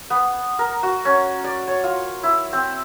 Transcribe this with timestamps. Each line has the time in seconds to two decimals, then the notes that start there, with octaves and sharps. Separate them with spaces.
0.10 B3
0.59 A#4
0.83 F#4
1.05 C#4
1.44 D5
1.68 C#5
1.84 F4
2.23 E4
2.53 C4